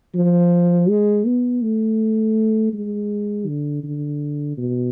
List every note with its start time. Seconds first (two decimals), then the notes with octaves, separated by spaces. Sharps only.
0.15 F3
0.89 G#3
1.26 B3
1.63 A3
2.73 G#3
3.47 D3
3.83 D3
4.58 B2